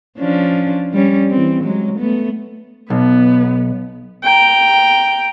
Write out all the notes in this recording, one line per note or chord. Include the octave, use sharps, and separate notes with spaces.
F3 C#4 D4
G3 C#4
E3 C4
F#3 G#3
A3 B3
B1 B3
G5 A#5